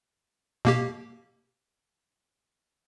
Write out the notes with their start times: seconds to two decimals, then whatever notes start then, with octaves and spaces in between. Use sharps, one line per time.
0.65 B2 A#3 G4